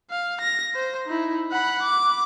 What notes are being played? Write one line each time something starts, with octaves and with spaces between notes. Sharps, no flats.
F5
A#6
C5
D#4 E4
F#5 B5
D6